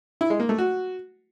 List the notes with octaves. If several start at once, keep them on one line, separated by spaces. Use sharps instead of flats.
E4
G#3
A#3
A3
F#4